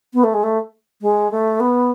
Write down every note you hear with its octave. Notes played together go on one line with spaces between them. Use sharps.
B3
A3
G#3
A3
G#3
A3
B3